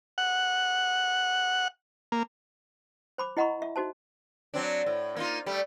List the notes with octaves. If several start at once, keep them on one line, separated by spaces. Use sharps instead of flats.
F#5
A#3
C5 B5 D6
E4 D#5 F#5 A#5 B5 C#6
E5
D#4 F#4 C5 A5
F#3 C4 D4
A2
A#3 D#4 F4
G3 A3